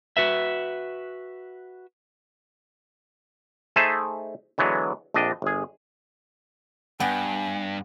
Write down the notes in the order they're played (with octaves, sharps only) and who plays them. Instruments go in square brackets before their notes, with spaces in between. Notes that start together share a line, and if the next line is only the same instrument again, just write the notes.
[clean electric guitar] F#4 B4 E5
[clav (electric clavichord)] A3 D#4 G#4 C5 E5 A5
D3 E3 F#3 G#3 B3
A#1 F2 D4 D#5
G1 G#4
[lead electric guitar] G2 [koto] B3 G5 [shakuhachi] G#5